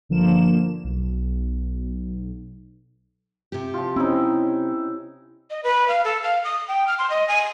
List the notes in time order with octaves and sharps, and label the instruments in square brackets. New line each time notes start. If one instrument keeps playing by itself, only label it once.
[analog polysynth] G1 D3 F3 A#3 E7
B1
[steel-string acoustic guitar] C3 G4
[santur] F3 F4
[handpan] C4 C#4 [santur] D#4 E4
[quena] D#5
B4
F5
A4
F5
D#6
G5
F6
C6
D#5
G#5